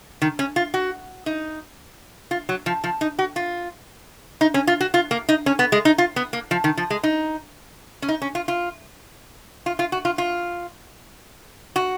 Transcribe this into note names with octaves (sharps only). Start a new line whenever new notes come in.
D#3
C#4
F4
F#4
D#4
F4
F#3
F3
F3
D#4
F#4
F4
D#4
C#4
F4
F#4
F4
A#3
D#4
C#4
B3
G#3
D#4
F4
B3
A#3
F3
D#3
F3
G#3
D#4
C#4
D#4
C#4
F4
F4
F4
F4
F#4
F4
F4
F#4